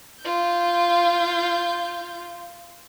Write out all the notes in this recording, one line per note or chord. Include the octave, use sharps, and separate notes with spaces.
F4 G6